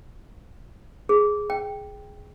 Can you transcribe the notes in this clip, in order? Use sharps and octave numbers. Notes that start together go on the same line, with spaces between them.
G#4
G5